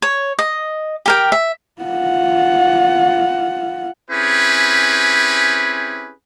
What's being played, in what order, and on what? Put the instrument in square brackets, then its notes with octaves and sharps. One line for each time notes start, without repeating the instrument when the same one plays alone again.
[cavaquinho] C#5
D#5
G4 A#4 G5
E5
[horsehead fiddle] F4 F#5
[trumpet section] C4 C#4 E4 G4 G#4 B4